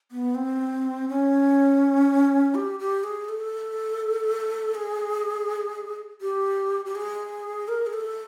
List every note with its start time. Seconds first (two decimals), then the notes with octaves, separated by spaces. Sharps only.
0.11 B3
0.35 C4
1.09 C#4
2.55 G4
2.79 G4
3.04 G#4
3.29 A4
4.75 G#4
6.21 G4
6.85 G4
6.95 G#4
7.68 A#4
7.86 G#4
7.93 A4